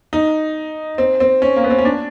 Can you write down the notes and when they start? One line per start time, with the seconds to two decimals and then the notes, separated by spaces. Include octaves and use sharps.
0.13 D#4
0.98 C4
1.20 C4
1.42 C#4
1.56 A#3
1.64 B3
1.70 C4
1.78 C#4
1.85 D4